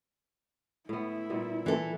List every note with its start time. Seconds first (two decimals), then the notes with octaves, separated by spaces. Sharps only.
0.89 A2 B3 E4
1.30 A#2 G3 B3
1.66 E3 A4